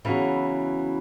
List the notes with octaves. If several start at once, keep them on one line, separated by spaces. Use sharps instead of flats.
C#3 E3 F#3 B3 E4